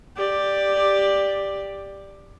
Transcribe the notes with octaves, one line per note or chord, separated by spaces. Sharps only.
G4 D5